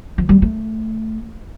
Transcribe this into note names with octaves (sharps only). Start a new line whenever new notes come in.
F3
G3
A3